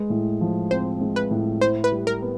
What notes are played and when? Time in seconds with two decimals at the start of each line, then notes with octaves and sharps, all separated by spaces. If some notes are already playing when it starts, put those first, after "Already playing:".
Already playing: G#3 B4
0.10 A2
0.41 F3
0.70 C4 C5
1.01 G#3
1.16 B4
1.31 A2
1.61 E4 C5
1.84 B4
1.92 G3
2.07 A#4
2.22 B3